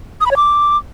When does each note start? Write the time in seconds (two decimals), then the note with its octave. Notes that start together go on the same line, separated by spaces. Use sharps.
0.21 D#6
0.26 B5
0.31 C#5
0.36 D6